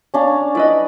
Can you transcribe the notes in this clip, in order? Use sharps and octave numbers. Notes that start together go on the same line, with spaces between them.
C#4 D4 F5
E4 B4 D5 D#5